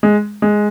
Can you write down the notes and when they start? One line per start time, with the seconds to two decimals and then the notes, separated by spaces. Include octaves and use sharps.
0.03 G#3
0.42 G#3